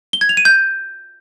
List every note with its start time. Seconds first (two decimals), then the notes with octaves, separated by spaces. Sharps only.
0.13 G7
0.21 G#6
0.29 F7
0.37 D#7
0.45 G6